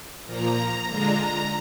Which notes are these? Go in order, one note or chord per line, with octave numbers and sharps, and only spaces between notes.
A#2 F3 A#3 A#5
D3 G#3 D4 F4 A#5
A#5